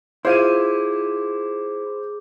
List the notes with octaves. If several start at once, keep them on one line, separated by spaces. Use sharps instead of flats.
E4 F4 G#4 C5 D6 D#7